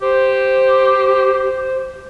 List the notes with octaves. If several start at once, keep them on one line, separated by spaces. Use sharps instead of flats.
G4 C5